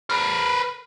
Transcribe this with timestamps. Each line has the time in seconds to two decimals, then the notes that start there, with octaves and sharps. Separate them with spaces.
0.10 A#4 B4